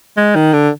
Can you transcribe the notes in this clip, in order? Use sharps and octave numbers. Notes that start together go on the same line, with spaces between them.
G#3
D#3
D3